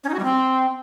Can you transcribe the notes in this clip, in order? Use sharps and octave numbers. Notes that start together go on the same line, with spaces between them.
C#4
D#4
F#4
G3
C4